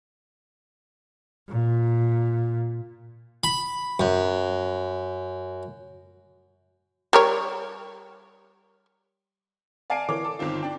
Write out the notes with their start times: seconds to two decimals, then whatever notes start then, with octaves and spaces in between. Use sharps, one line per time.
1.49 A#2
3.44 B5
4.00 F#2
7.13 G3 A#4 C#5
9.90 D5 F5 G#5 A5 C7 D7
10.09 E3 A#4 C#5 D6
10.24 A4
10.39 G1 D#3 C4 F4
10.63 D4 G5